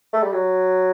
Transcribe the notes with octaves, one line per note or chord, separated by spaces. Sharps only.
A3
G3
F#3